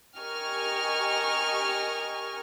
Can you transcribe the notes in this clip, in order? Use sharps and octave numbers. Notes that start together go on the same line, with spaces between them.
G4 A#4 D#5 G#5 C#6 F6